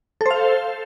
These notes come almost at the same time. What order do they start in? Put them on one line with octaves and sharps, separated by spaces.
A4 C5 F5